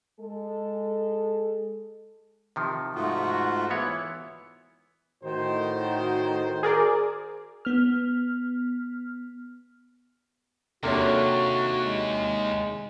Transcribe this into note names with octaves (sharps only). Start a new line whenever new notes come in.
G#3 A4
C3 D#3 F3
G#2 A3 F4 F#4
E3 B3 E4 C#5
A2 D#3 F#4 C5
G#4 A#4 D5
B3 F6
D#2 C3 A#3 D4 F#4 A4 C#5
G#3